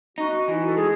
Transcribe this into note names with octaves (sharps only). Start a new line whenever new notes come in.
D#4 F#4
E3 F#4
A4
G#3 G#4